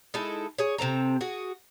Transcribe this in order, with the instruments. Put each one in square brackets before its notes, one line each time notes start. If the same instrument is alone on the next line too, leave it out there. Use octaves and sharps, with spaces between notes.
[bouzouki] G#3 D#4 E4 A4
G#4 C#5
C3 C4 A4 A#5
F#4 G#4